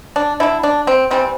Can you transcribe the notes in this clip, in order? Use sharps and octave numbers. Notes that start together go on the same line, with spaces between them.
D4
D3 A3 E4
D4
C4
C3 E3 G3 C4